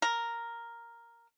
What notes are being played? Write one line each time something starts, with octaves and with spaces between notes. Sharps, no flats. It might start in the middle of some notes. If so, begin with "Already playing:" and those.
A#4